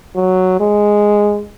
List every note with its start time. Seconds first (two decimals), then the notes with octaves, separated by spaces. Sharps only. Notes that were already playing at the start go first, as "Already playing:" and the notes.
0.16 F#3
0.60 G#3